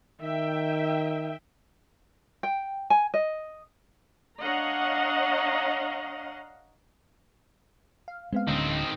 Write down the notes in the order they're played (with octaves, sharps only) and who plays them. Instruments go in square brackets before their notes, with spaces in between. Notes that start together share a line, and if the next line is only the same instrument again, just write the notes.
[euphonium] D#3 [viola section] E5 G5
[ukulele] G5
G#5
D#5
[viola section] D4 C#5 D#5 F5 F#5 A#5
[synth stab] F5
[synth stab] G#3 B3 F5 [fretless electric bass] C4
[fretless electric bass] D1 D3 C#4 [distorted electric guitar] D#3 C4